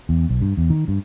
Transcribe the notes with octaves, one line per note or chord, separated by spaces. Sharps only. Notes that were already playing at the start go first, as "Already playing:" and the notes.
E2
B1
G2
E2
D#3
G2